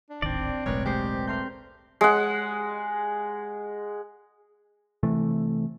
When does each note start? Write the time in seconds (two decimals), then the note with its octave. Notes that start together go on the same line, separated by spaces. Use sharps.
0.10 D4
0.22 D1 G#1 D#3 C4 D5
0.66 E1 B1 A2 G#3 A#4 B4 C#5
0.85 G#3 G4 C5
1.27 A3 A#4 C6 G6
2.01 G#3 F#5
5.03 C3 E3 A3